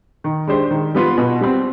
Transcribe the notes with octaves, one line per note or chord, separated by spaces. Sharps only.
D#3
G#3 D4 G4 C5
D#3
G3 B3 F4 B4
B2
G3 C4